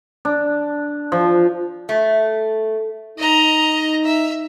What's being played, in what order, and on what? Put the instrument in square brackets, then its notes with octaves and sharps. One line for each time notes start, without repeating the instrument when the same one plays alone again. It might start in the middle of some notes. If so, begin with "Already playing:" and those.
[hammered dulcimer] D4
F3
[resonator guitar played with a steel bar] A3
[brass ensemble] D#4 [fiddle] D#5 A#5
[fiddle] E5